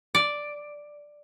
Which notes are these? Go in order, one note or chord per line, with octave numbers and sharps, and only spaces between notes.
D5